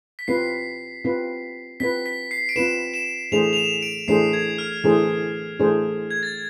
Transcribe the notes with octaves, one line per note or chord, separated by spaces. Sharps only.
B6
C4 F4 B4 C7
C4 F4 B4
C4 F4 B4 B6
B6
C7
D7
C4 F4 B4 E7
E7
E3 A3 D4 G#4 C5 F7
F7
E7
D7
E3 A3 D4 G#4 C5 C7
G#6
F6
E3 A3 D4 G#4 C5
E3 A3 D4 G#4 C5
G#6
A6